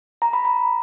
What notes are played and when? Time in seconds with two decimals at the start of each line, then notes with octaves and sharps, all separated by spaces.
0.22 A#5
0.33 B5
0.45 A#5